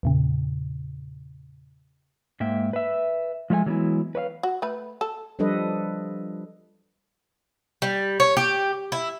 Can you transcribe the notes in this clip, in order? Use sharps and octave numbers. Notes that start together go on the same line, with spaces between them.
E2 A#2 C#3
G#2 A#3 E5 G5
B4 E5
F3 G#3 A3 F5 G#5
E3 F#3 G#3 B3 E4
B4 C#5 E5 F5
F#4
A3 B4
A4
F3 G3 D4 A4 B4 D#5
G3
C#5
G4
E4